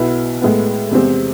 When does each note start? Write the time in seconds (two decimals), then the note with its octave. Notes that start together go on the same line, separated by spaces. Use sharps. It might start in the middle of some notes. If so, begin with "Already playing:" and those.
Already playing: B1 B2 B3 E4
0.42 A2 G#3 B3
0.91 E2 C3 G#3 C4